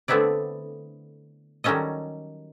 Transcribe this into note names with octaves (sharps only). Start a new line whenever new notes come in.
D3 A3 B3 C4 E4 D5
D#3 F#3 G3 C#4 A4 D#5